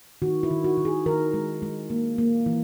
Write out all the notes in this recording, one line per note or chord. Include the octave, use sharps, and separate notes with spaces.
D#3 F#4
E4
D#3
F#4
D#3
G#4
D#3 A#4
G#3
G#3
A#3
A#3
E3